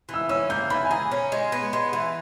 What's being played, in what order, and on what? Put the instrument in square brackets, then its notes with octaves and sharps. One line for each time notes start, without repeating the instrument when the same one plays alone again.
[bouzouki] E3
[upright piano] E6
[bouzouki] C#4 [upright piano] E6
[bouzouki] A#3 [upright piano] G6
[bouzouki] E3 [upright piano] B5
[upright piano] G#5
[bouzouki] G#4 [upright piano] A#5
[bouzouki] C#4
G#3
B3
G#3
E3